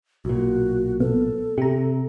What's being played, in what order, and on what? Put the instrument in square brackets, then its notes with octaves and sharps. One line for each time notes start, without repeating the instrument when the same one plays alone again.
[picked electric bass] B1 A#2 [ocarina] F#4
[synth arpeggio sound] B2 B3 [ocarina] A4
[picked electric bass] C3 [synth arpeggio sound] G4 A#5